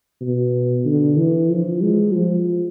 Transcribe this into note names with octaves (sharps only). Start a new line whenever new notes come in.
B2
D3
E3
F3
G#3
F3